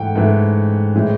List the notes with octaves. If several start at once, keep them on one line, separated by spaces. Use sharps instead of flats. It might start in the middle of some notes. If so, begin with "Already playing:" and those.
Already playing: G#2 E3 A3 F#5 G5
G#2 E3 A3
A2 E3 G#3